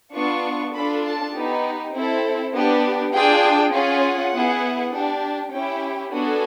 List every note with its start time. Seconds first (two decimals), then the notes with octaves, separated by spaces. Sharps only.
0.14 B3 D4 F4 C#6
0.73 D4 F4 A4 B5
1.04 A5
1.34 B3 D#4 G4
1.93 C4 E4 A4
2.54 B3 D4 G4
3.13 D4 F4 G#4 G5
3.72 C#4 F4 G#4 F#5
4.32 B3 E4 G#4
4.93 D4 G4
5.52 C#4 E4 G4 G5
6.12 B3 D4 F#4 A4 G#5